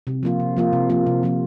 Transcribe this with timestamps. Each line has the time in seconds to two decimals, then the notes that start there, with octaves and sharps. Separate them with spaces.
0.07 C3
0.23 F3 A#3 F4
0.40 C3
0.57 F3 A#3 F4
0.73 C3
0.90 F3 A#3 F4
1.06 C3
1.23 F3 A#3 F4